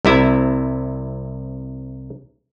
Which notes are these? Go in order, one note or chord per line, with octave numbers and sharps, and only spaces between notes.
C2 C3 E4